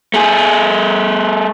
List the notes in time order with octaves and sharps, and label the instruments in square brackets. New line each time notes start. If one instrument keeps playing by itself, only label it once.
[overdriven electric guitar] A3 G#4